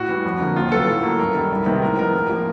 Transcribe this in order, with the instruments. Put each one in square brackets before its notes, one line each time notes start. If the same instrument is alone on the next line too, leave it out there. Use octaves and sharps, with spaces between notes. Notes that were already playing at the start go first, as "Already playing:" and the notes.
Already playing: [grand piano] A2 F#4
E3 G3
F2
D3 F3 A#3
D#2 F4
C#3 F#3 B3 A4
A2
F#3 A#3
F#2 A#4
D#3 G3
C2
C3 D#3 G#3 B3
A2 A#4
F3 G#3 B3 A#4
A2
F3 A#3